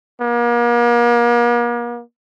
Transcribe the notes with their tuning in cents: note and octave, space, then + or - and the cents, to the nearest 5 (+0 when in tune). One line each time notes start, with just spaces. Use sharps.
A#3 +40